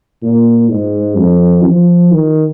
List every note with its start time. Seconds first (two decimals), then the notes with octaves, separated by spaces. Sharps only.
0.22 A#2
0.69 G#2
1.16 F2
1.64 F3
2.11 D#3